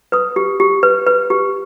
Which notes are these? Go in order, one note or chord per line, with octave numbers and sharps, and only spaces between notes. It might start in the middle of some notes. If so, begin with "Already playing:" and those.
B4 D#6
G4
G4
B4
B4
G4